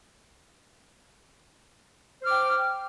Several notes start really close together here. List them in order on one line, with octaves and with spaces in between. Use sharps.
C5 F6 D6 G5